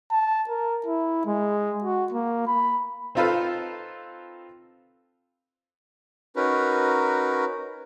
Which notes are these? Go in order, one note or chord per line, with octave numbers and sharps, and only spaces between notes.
A5
A#4
E4
G#3
F#4
A#3
B5
C4 D#4 F4 A4 B4 F5
C#4 D#4 F#4 A#4 B4